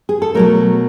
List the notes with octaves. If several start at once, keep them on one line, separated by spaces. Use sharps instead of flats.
G#4
A4
B2 F#3 A3 A#4